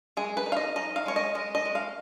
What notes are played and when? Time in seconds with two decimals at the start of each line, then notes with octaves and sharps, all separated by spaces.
0.17 G#3 G#4
0.37 B4
0.46 D#4
0.52 F5
0.57 D#5
0.76 D#4 D#5
0.96 F5
1.06 G#3 C#5
1.16 D#5
1.35 G#3 D#5
1.55 D#5
1.65 G#3
1.75 F5